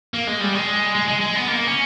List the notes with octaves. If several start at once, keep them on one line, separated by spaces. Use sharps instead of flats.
A#3
G#3
G3
G#3
G#3
G#3
G#3
B3
A#3
C#4